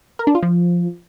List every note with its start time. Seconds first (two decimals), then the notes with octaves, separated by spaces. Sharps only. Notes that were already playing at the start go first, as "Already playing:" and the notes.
0.19 A#4
0.27 D4
0.35 F4
0.43 F3